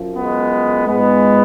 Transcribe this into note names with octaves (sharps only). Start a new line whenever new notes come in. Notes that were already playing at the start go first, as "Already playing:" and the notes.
Already playing: F#2 F3
G#3 B3
G#2 F3 G#3 B3